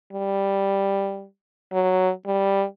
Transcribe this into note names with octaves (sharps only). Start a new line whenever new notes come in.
G3
F#3
G3